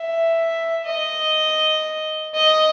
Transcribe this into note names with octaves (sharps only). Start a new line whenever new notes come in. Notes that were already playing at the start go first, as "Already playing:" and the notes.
Already playing: E5
D#5
D#5